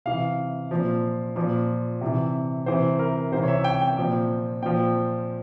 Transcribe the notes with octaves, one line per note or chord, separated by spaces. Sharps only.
C3 E3 F5
A#2 F3
A#2 F3
C3 E3
C3 E3 C5
A#4
C3 E3 C5
C#5
E5
G5
G5
A#2 F3
A#2 F3 G5